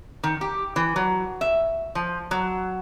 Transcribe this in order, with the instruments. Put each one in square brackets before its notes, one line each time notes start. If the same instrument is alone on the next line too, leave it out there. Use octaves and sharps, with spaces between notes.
[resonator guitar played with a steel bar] D#3
G4
E3
F#3
E5
F3
F#3